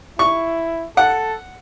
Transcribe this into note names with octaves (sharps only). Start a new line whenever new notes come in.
E4 C#6
A4 F#5